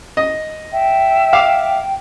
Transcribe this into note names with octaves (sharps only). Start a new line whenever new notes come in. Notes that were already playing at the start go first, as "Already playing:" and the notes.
D#5
E5 G5
F5 D6